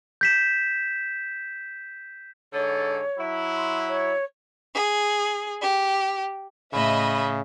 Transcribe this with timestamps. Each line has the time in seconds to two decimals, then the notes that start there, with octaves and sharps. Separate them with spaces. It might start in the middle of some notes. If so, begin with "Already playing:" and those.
0.21 G6 B6 E7
2.53 G#2 D3 A4 C#5
3.19 F#3 E4
3.56 C6
3.88 C#5
4.74 G#4
5.61 G4
6.73 A2 C#3 D#5 E5 B5